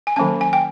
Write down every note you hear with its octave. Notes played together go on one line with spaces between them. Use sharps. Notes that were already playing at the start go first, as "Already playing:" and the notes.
G#5
D#3 F#3 A#3 C#4 A5
G#5
G5